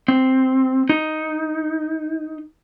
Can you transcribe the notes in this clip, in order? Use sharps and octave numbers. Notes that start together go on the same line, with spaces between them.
C4
D#4